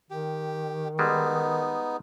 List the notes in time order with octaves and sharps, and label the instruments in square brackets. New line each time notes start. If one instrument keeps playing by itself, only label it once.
[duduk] D#3 [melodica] G4
[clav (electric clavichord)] G3 G#3 [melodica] B3 D#4